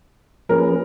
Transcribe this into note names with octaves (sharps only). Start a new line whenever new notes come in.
F3 A#3 C#4 G#4 A#4 B4